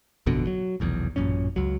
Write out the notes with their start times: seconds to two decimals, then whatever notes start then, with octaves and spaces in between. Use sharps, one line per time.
0.26 A1 F2 B2 D3
0.47 F#3
0.80 F1 B1 E2
1.16 A1 F#2 A#2 C#4
1.56 C#2 F#3